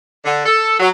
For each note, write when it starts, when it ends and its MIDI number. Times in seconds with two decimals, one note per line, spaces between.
0.25 0.45 50
0.45 0.76 69
0.79 0.89 54